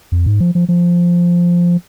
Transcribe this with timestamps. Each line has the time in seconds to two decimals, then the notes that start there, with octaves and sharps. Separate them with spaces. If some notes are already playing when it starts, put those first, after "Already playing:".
0.12 F2
0.26 G#2
0.40 F3
0.55 F3
0.69 F3